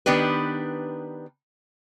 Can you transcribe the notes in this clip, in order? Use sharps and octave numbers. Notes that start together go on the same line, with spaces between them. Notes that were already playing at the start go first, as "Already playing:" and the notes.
D#3 B3 D4 G4 B4